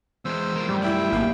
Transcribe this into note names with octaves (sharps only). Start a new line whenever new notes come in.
E2 G#3 C5 E6
F3 A#4
F#2 A2 G3
E4 E5 G5
G#1 A#3